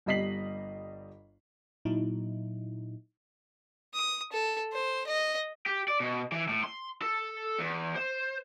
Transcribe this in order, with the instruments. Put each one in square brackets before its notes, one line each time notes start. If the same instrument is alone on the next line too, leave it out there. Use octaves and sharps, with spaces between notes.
[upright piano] G1 G3 D#5 B6 C7 F#7
[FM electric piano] A#2 F#3 D#4 E4
[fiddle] D#6
A4
C5
D#5
[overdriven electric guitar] G4
D5
B2
E3
A2
C6
A4
E2
C5